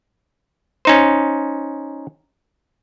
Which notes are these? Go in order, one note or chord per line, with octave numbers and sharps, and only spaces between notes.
C#4 D#4 C5